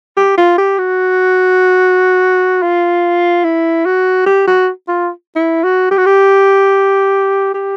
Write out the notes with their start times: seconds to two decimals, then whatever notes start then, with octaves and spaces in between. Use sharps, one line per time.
0.17 G4
0.38 F4
0.58 G4
0.79 F#4
2.62 F4
3.44 E4
3.85 F#4
4.26 G4
4.48 F#4
4.88 F4
5.36 E4
5.64 F#4
5.91 G4
5.98 F#4
6.06 G4
7.54 G4